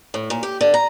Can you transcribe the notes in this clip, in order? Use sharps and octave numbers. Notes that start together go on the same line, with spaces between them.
A2
A#2
G4
D3
A#5